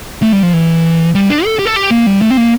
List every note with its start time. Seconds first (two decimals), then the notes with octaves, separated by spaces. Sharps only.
0.23 A3
0.33 G3
0.43 F3
0.53 E3
1.15 G3
1.30 D4
1.45 A4
1.59 G4
1.65 A4
1.76 G4
1.91 A#3
2.06 G3
2.22 A3
2.30 C4
2.37 A#3